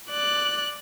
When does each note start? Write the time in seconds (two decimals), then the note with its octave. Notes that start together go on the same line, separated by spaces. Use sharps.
0.10 D5 F#6